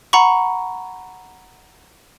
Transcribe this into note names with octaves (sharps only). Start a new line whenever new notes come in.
F#5 A#5 B5 C#6